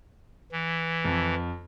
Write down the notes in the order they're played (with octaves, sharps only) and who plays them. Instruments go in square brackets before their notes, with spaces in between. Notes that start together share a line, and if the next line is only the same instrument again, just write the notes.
[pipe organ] E3
[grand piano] F2